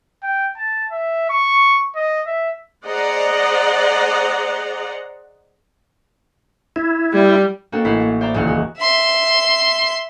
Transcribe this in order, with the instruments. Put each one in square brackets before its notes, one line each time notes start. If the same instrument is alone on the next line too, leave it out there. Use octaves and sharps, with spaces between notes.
[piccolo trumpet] G5
A5
E5
C#6
D#5
E5
[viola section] G#4 C5 D5 D#5 F#5 A#5
[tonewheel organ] E4
[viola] G3
[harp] A#3 C4 D#4 F#4 A4
A1 E4 A#4 B6 C7
A3
C5 D5 E5 A#5
D#1 C#2 E3 A#3 F#5 F6
G#3 F#4
[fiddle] E5 C6